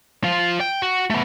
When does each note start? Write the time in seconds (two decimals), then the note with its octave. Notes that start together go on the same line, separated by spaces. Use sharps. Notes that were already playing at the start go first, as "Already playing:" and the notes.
0.24 F3 F4
0.60 G5
0.82 F#4
1.10 A3 B3